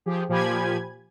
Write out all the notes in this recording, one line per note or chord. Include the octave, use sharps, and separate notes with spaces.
F3 G4 G#4
A#2 F3 G4 G#5 B5 G#6